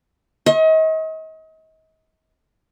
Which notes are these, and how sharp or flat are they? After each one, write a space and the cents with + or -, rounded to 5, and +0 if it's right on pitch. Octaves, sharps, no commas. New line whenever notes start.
D#5 +35 C#6 -45